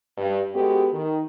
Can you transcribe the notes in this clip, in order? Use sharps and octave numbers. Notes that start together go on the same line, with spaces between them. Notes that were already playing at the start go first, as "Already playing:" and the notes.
G2
G#3 B3 F#4 G4 A4
D#3